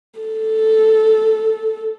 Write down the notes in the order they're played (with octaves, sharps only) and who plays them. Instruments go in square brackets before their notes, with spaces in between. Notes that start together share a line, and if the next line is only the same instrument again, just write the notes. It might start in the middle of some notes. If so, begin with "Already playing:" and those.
[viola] A4